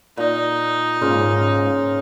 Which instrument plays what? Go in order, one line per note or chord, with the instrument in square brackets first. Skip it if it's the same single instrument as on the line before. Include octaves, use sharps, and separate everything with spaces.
[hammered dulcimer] A#2 [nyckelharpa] D#4
[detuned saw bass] G#2 [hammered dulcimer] C#3 A#3 F4